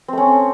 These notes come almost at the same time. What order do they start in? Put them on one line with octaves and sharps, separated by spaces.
C4 A3 C#4